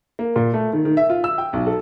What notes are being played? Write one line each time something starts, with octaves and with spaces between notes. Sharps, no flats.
A#3
A#2
A3
D#3
D#3
E5
F4
E6
G5
B1
A4